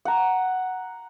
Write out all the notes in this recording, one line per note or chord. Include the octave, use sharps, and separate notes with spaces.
F#5 A#5